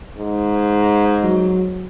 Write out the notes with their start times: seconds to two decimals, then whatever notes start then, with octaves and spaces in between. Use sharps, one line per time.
0.17 G#2
1.23 F#3